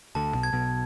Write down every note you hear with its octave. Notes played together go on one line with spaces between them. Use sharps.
D2 D3 A5
B1 B2
G#6
B1 B2